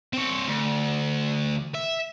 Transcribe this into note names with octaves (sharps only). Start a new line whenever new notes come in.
C4 C#5
D2
E5